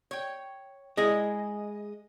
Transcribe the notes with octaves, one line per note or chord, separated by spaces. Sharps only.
C#5 G5
G#3 E4 G#4 D#5